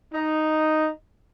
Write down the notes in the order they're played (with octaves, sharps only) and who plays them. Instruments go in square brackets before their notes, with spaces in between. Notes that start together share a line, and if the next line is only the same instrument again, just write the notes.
[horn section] D#4